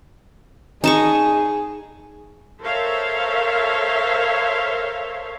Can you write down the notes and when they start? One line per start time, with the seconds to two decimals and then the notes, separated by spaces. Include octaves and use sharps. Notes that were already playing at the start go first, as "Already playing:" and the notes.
0.84 D#4 G#4 A5 C#6
2.61 A4 A#4 C5 C#5 E5 F5